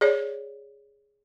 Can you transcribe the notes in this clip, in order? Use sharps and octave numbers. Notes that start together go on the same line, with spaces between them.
G#4 C#5 D5